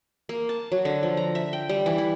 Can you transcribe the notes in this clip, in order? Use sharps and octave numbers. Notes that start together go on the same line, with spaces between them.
A#3
A5
F#3
D3
F3
A#5
E5
G5
G3
E3
E4